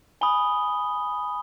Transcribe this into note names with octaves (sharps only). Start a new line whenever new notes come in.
G#5 B5 D#6 G7